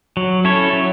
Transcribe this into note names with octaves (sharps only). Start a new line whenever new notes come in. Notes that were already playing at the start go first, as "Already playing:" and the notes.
F#3
C#4 E4 A4 C#5
F#3